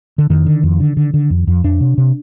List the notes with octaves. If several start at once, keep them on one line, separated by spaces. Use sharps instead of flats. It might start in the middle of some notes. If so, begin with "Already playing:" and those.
D3
F2 D#3
D3
F2
D3
D3
D3
F2
F2
F2 D4
C3
C3